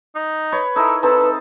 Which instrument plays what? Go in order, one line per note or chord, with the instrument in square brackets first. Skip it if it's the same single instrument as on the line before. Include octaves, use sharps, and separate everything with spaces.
[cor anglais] D#4
[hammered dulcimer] B4 C#5
[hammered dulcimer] D#4 E4 A#4 [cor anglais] A4
[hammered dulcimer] C4 D#4 A5 [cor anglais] A4 [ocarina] B4